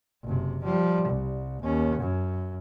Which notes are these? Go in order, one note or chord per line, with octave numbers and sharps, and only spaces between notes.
F#1 C3
F3 G3
C2
D#2 C#4
F#2